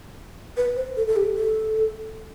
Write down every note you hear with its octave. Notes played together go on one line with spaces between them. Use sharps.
B4
C5
A4
A4
G4
A4